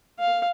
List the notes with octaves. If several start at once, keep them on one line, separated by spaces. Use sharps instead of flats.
F5